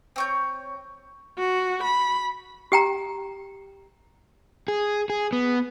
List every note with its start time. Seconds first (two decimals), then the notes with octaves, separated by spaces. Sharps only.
0.16 C4 C#5 G6
1.38 F#4
1.83 B5
2.72 G4 G5 A#5
4.68 G#4
5.10 G#4
5.33 B3